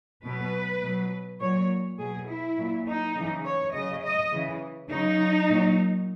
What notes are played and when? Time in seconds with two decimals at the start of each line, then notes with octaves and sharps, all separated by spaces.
0.24 B2 F#3 B4
0.83 B2 F#3
1.41 A#2 F#3 C#5
1.99 B2 F#3 G#4
2.29 E4
2.58 A#2 F#3
2.87 D#4
3.16 C#3 E3
3.45 C#5
3.74 C#3 F#3 D#5
4.04 D#5
4.33 C#3 E3
4.91 C#3 F#3 D#4
5.49 A#2 F#3